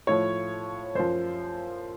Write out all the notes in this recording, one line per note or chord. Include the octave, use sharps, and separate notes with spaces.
A2 F3 C#5
F#2 F3 C5